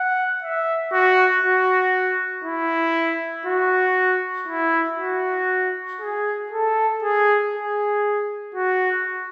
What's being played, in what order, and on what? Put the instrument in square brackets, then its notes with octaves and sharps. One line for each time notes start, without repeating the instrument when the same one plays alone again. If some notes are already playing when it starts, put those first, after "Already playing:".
Already playing: [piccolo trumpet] F#5
E5
F#4
F#4
E4
F#4
E4
F#4
G#4
A4
G#4
G#4
F#4